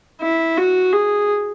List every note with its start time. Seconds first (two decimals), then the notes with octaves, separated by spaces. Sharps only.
0.21 E4
0.57 F#4
0.93 G#4